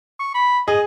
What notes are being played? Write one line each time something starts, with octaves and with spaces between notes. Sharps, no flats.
C#6
B5
G#4 D#5